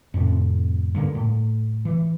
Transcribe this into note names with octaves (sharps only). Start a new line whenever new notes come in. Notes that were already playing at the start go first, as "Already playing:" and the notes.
F2 A2 C3 F3
G2 D3 A#3
A2
E3